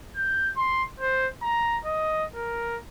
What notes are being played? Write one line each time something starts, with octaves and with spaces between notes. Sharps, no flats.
G6
C6
C5
A#5
D#5
A#4